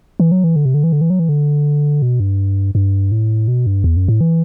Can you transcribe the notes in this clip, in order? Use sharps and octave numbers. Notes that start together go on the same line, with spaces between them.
E3
F#3
E3
D3
C3
D3
E3
D3
E3
F#3
E3
D3
B2
G2
G2
A2
B2
G2
E2
F#2
A2
E3